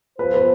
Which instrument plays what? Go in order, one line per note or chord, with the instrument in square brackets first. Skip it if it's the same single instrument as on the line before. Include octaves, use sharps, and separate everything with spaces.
[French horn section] F3 B3 F4 C5 [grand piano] B4
[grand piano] B4